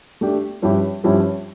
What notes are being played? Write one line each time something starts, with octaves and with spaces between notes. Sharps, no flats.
A3 D4 G4
G2 F3 C#4 E4 G4
G2 F3 C#4 E4 G4